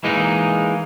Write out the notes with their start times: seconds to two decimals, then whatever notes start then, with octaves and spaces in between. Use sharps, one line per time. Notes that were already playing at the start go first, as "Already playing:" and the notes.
0.04 E3 G#3 A#3 D#4